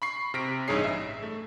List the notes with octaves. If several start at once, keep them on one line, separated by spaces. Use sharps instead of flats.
B5 C#6 C7
C3 F6 A#6 B6 D7
A1 G2 D#4 G#4 C#5 C7
E5
A3